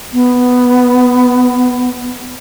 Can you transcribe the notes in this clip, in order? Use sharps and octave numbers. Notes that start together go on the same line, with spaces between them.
B3